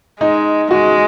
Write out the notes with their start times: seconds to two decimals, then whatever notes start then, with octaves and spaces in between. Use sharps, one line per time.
0.20 G#3 D#4
0.71 G#3 F#4